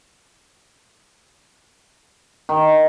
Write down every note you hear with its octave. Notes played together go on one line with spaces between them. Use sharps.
D#3